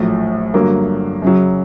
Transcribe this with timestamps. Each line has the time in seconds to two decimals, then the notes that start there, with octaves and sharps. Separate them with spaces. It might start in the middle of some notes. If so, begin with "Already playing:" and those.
Already playing: A#1 A2 F#3
0.54 G2 D3 F#3 A#3
1.22 F#2 C#3 F#3